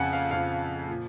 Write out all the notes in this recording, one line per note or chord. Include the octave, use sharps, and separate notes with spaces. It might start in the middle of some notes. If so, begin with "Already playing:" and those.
Already playing: F2 C#3 F3 F#5 G#5
F5
F2 C#3 F3 F5
A#2 F3